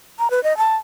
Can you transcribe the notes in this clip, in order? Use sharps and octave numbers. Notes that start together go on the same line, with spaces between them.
A#5
B4
D#5
A5